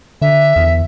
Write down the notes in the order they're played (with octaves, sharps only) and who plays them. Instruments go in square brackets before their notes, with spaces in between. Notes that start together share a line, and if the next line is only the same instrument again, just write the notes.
[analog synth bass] D3 [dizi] E5
[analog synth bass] E2